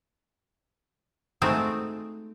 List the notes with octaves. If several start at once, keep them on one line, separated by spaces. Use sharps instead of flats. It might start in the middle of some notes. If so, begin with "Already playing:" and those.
G#3 A3 C4 D#4 F#4 A4